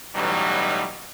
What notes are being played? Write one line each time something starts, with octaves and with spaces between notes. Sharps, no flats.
A1 B2 E3 F#3 G3 D#4